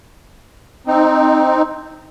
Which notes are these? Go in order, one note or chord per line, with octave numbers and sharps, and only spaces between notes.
C4 D#4